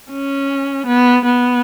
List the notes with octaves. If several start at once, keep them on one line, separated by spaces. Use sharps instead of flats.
C#4
B3
B3